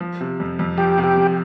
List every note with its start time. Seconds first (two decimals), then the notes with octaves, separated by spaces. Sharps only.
0.01 F3
0.21 C3
0.40 F2
0.59 F2
0.77 F3 G4
0.97 C3
1.04 G4
1.16 F2